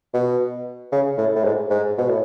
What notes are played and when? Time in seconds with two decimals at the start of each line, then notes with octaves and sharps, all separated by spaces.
0.14 B2
0.92 C#3
1.18 A2
1.36 A2
1.45 G#2
1.70 G#2
1.98 B2
2.09 A2